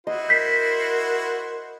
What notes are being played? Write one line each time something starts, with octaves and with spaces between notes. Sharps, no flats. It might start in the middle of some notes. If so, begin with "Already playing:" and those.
E4 F#4 C5 D#5
A#4 G6 B6 C7